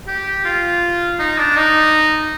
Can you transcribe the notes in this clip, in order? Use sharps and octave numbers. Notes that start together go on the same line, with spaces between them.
G4
F4
D#4
D4
D#4